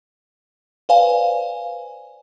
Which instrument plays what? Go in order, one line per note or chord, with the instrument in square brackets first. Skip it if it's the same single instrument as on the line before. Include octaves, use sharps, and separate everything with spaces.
[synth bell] B4 C5 D5 F5 G#5